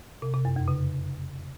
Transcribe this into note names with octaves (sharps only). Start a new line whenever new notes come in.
C3
C3
F#2
F2
C#3